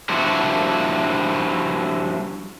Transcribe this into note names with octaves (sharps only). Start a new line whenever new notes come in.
F3 G3 D4 E4 F#4